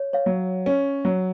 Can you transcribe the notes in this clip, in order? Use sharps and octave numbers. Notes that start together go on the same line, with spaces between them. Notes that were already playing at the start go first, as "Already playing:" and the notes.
Already playing: C#5
C#5 F5
F#3
C#4
F#3